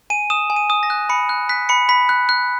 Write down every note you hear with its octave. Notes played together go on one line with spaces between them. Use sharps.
G#5 D#7
D#6 E7
G#5
D#7
D#6
A#6
F#6
B5 C#7
F#6
F#6 B6
B5 C#7
B5 B6
F#6
F#6